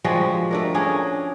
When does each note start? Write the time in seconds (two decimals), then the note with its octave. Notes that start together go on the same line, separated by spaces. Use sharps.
0.04 F3 G3 G#3 F#4
0.51 A3 D4 A#4
0.74 C#4 D4 G#4 A#4